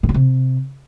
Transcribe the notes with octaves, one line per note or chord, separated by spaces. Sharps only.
B2
D3
C3